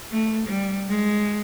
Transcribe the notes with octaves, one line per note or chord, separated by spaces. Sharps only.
A3
G3
G#3